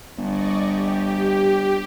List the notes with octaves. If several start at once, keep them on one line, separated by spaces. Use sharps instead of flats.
G1 D5 D#5 C#6
G4